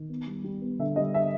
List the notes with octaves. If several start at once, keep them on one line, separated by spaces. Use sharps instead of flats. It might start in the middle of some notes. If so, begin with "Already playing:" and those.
Already playing: D#3
B3
G3
G3
B3
D3 E5
G3 D#5
D4 E5